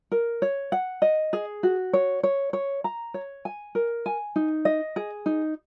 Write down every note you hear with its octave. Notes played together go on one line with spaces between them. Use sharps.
A#4
C#5
F#5
D#5
G#4
F#4
C#5
C#5
C#5
A#5
C#5
G#5
A#4
G#5
D#4
D#5
G#4
D#4